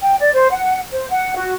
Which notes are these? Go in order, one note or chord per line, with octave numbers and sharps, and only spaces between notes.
G5
D5
C5
F#5
C5
F#5
F#4